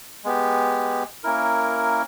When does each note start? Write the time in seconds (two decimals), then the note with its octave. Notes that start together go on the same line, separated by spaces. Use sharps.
0.24 G#3 B3 G4
1.23 A#3 C#4 E4 A#4